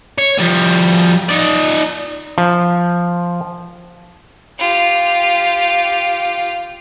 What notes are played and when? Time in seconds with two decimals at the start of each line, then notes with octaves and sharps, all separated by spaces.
0.18 C#5
0.39 F3 G3
1.29 D#4 D5
2.38 F3
4.59 F4 G4